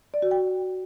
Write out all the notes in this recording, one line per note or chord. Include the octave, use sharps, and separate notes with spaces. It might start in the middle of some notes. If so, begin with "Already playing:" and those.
D5
F#4
G5